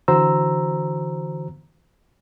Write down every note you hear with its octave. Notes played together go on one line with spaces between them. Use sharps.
D3 E3 F#4 C5 A#5 E6